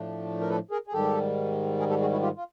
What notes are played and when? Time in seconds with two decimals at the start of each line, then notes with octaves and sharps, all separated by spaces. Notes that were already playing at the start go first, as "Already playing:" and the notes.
Already playing: A2 F3 A3 D4
0.40 A#4
0.50 A4 B4
0.71 G#4 A#4
0.87 G#4
0.93 G#2 D#3 G3 G4 A4
1.79 G#4 A#4
1.90 G4 A4
2.01 F#4 G#4
2.12 E4 F#4
2.22 F4 G4
2.37 F4